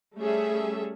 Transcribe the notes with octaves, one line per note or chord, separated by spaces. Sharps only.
G3 A3 C#4 G#4 A4 E5